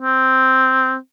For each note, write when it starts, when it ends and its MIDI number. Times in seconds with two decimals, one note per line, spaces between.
0.01 0.96 60